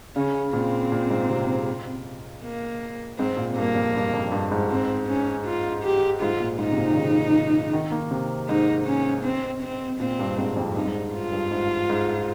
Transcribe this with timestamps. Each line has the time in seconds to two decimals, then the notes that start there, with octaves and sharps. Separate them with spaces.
0.16 C#3 C#4
0.53 A#2 C4
0.92 A#2
1.10 G#2
1.30 C3
2.43 A#3
3.18 G#2 C4
3.37 A#2
3.56 G2 A#3
3.75 F2
3.95 G2
4.13 F2
4.32 G2
4.51 G#2
4.70 C4
5.08 C#4
5.46 F4
5.83 G4
6.21 G#2 F4
6.40 A#2
6.59 G#2 D#4
6.72 C3
6.78 A#2
6.91 D#3
6.96 C#3
7.73 D#3
7.92 A#3
8.11 C3
8.48 G#2 D#4
8.86 C#4
9.24 C4
9.62 C4
10.00 A#2 C4
10.19 G2
10.38 G#2
10.57 F2
10.75 G2 D#4
10.86 G#2
10.95 G2
11.13 F4
11.32 G2
11.51 G#2
11.90 G#2